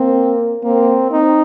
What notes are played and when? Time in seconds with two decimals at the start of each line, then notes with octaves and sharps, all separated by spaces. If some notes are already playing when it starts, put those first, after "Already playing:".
Already playing: A#3 C4
0.64 A#3 C4
1.12 C4 D#4